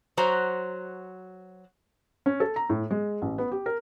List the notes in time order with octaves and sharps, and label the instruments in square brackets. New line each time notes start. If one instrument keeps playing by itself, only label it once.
[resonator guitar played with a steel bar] F#3 F#4 C5 A#5
[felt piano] C#4
A4
A#5
A2
G#3
A1
B3
G4
A#4